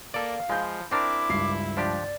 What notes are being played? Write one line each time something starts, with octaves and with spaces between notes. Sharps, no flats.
A#3 A4 D5 F5
F3 G#3 B5 G6
C4 D4 E4 A#4 D6
C#2 G2 C7
F3 D4 G4 D5